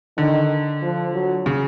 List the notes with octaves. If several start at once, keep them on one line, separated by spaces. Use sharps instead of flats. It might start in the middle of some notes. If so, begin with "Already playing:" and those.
D3 D#3
F3
F#3
C#3